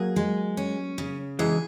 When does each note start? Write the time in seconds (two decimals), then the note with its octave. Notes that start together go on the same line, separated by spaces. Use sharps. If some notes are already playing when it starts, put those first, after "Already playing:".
Already playing: F#3 A#3 G#4
0.16 G#3
0.57 C#4
0.98 C#3
1.39 E3 G#3 G#4